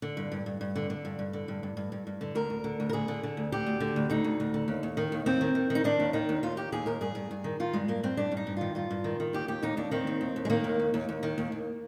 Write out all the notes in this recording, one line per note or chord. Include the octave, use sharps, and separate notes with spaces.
D3
G2
G2
G2
G2
D3
D3
G2
G2
D3
G2
G2
G2
G2
G2
D3
D2 A#4
D2
D3
D2
A#4
D3 G#4
D3
D3
D2
D3 G4
D2
D3
D2
D3 D#4
D2
D2
D3
D#2
D#2
D#3
D#2
D#2 C4
D#3
D#3
D#3
D#4
D#3 D4
D#2
D#3 D#4
D#2
D#2 F4
D#2 G4
D#2 G#4
D#2 A#4
G2 G#4
G2
G2
D#3
D#3 F4
G2 G#3
G2 A#3
G2 C4
G2 D4
G2
D#4
G2
D#3 F4
G2 F4
G2
D#3
D#3
D#2 G4
D#2 G4
D#2 D#4
D#2 D4
D#3 C4
D#2
D#2
D#2
G#3
D#3 A#3
D#2
D#2
D#2
D#2
D#3
D#2
D#2